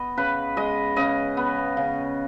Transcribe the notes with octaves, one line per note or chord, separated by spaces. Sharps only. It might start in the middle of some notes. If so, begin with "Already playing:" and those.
Already playing: B3 D#5
C#3 B4
G#3 D#5
C#3 D#5
B3
C#3